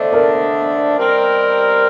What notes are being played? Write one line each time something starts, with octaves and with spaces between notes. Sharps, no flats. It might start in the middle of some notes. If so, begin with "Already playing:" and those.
Already playing: D3 A3 D4 C5 D#5
A#4 D5
G3 C4 G4 A#4